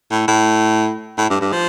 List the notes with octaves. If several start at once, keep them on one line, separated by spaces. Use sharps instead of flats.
A2
A2
A2
G2
G2
F3